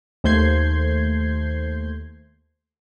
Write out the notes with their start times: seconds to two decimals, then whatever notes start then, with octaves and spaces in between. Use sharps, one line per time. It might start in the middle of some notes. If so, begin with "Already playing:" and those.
0.24 D#2 A3 C5 G6 G#6 C7